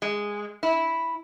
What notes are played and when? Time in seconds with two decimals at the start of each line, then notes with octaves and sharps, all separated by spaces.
0.02 G#3
0.63 E4